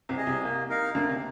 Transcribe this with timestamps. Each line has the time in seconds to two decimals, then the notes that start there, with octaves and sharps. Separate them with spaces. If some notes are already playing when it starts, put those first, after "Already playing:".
0.09 C2 C3
0.17 G#4 D#5
0.27 C2 C3
0.43 A#3
0.70 D#4 A#4 F5
0.95 D2 D3 A#3
1.09 C3